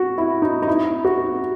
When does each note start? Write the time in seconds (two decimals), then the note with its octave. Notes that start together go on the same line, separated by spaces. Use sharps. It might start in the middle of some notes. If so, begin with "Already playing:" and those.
Already playing: F#4
0.18 E4
0.42 D#4
0.62 D#4
0.67 E4
1.05 F#4